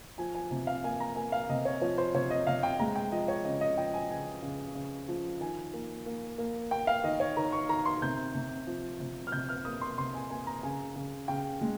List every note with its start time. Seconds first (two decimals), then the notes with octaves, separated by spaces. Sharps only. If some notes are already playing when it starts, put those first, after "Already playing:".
0.18 F3 G#5
0.35 G#5
0.51 C3
0.67 F5
0.84 A#3 G#5
1.00 A#5
1.16 A#3 G#5
1.32 F5
1.49 C3 D#5
1.65 C#5
1.82 F3 C#5
1.98 C5
2.14 C3 C#5
2.30 D#5
2.47 C3 F5
2.63 G5
2.79 G#3 A#5
2.96 G5
3.12 F3 D#5
3.28 C#5
3.45 C#3 D#5
3.61 D#5
3.77 F3 G5
3.94 G#5
4.10 C#3 G#5
4.43 C#3
4.75 C#3
5.08 F3
5.41 D#3 G#5
5.73 A#3
6.06 A#3
6.38 A#3
6.71 A#3 G5
6.87 F5
7.04 D#3 D#5
7.20 C#5
7.37 D#3 A#5
7.52 C#6
7.69 D#3 A#5
7.86 C6
8.02 C3 G6
8.35 C3
8.67 F3
9.00 C3
9.27 F6
9.32 C3 G6
9.49 F6
9.65 A#3 D#6
9.81 C6
9.98 C3 C6
10.14 G#5
10.30 A#3 G#5
10.47 A#5
10.63 C#3 G#5
10.96 C#3
11.28 C#3 G5
11.61 G#3